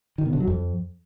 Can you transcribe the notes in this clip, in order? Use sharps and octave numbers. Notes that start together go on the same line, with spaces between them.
D#3
B2
D3
F#3
F2